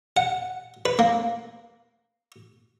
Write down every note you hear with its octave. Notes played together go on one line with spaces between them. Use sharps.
F#5
B4
A#3